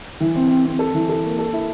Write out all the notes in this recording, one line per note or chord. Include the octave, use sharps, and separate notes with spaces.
E3
C4
C4
C4
A4
E3
A4
A#3
A4
E4